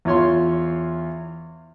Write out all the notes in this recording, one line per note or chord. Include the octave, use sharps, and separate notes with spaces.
E2 F4 C#5 C6